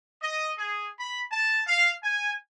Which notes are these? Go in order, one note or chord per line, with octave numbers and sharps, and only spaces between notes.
D#5
G#4
B5
A5
F5
G#5